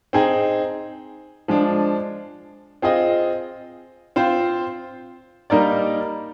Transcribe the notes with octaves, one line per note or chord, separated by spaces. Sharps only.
C4 D#4 G#4
F3 G#3 D4
C4 F4 G#4 D#5
C4 F4 C5
G3 A#3 D#4 A#4 D5